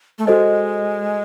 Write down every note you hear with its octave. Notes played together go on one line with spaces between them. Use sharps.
A3
G#3 F#4 A4 C5 D#5